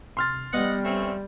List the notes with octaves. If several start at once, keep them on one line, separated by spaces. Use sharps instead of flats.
C3 C6 F6 A6
G3 B3 D5 D#5 F#5 G5
A3 C4 C#4